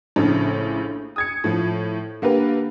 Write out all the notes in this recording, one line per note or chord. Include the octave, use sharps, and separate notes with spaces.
A#1 A2 C#3
D#6 G#6 C#7
A2 F3
D3 A#3 G4 B4